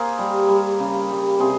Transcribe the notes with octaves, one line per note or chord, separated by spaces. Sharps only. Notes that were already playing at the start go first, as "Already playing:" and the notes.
Already playing: A#3 G#4 A#4 C5
G3
G3
C#3
G3
C3 G#4 C5